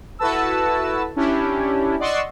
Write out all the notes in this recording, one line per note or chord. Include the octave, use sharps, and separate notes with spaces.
E4 F#4 A4 B4 A5 E6
C#4 D4 E4 G4
D5 D#5 F#5 C6 C#6 E6